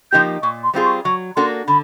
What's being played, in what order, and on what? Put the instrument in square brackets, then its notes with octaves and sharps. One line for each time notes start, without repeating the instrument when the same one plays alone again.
[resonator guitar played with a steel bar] F3 A#3 D#4 G4 [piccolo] G6
[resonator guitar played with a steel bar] A#2 [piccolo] C#6
[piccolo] C6
[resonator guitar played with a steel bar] G3 C4 F4 G#4
[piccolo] C#6
[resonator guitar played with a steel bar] F#3 [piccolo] C#6
[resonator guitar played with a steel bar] A#3 D4 F#4 A4 [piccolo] C6
[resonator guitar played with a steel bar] D3 [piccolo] B5